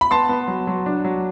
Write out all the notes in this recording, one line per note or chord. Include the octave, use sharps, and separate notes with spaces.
B5
B3 A5 C6
B3
F#3
F#3
D4
F#3